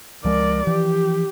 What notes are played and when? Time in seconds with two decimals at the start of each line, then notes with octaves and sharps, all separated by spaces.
0.24 C#2 F3 G#3 A#4 D5
0.67 E3 F3 G4